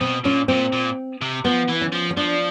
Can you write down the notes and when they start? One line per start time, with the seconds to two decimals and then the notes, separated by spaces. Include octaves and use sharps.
0.01 B2 C4
0.24 A#2 C#4
0.48 A#2 C4
0.72 A#2
1.21 C3
1.45 F3 B3
1.69 E3
1.81 C#4
1.93 F3
2.11 C#4
2.17 F3 D4